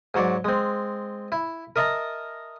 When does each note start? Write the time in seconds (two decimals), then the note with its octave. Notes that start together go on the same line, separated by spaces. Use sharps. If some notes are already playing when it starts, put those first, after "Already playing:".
0.14 G#2 F#3 C#5 D5
0.45 G#3 C4
1.32 E4
1.76 A#4 D#5 E5 A5 A#5